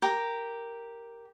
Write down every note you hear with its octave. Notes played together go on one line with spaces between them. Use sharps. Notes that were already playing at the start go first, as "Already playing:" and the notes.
G4 A#4